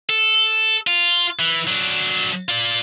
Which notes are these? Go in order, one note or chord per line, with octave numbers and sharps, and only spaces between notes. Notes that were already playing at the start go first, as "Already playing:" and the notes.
A4
F4
E3
F#3 D4
F4 D5